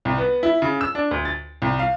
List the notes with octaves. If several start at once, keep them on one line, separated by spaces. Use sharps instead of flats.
C2
B3
E4
C#3
E6
D4
D2
A6
C2
F5